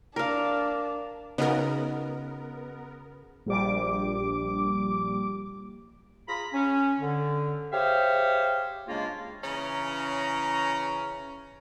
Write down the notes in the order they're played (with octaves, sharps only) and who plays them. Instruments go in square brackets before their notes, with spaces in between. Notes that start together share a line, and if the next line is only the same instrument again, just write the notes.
[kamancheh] D4 [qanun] A#4 F5
[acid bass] C#3 [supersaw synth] B3 A#4 [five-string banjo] D#4 F#4
[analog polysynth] A#1 G3 D6
[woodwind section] F4 G#4 A#5 B5
C#4
D3
G4 G#4 C5 C#5 E5 F5
C#3 G#3 A#3 D4 F4
[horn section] C#3 E3 C#4 A#5